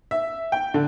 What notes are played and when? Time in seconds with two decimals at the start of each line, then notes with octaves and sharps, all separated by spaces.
0.11 E5
0.52 G5
0.74 D3